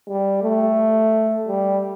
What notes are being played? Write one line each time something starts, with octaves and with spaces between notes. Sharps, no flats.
G3
A3
G3